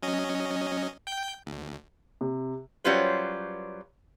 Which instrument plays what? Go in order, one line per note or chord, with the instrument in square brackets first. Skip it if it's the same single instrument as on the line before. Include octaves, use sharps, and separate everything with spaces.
[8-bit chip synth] F#3 C#4 D#5
G5 G6
D2
[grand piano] C3
[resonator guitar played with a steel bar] F#3 G3 C#4 F4 B4 C5